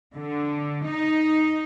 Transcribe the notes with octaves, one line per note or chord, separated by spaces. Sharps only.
D3
D#4